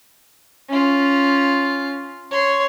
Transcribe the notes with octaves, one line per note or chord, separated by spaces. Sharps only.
C#4 F4
C#5 C6